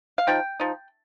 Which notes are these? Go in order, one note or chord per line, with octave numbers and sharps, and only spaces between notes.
F5
F3 D#4 G5
F3 D#4